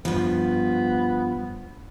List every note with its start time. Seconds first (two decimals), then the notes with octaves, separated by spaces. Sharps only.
0.05 G2 F3 B3